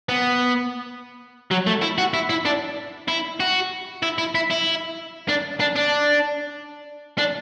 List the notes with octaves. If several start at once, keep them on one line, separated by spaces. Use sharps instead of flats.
B3
F#3
A3
E4
F#4
E4
E4
D4
E4
F#4
E4
E4
E4
E4
D4
D4
D4
D4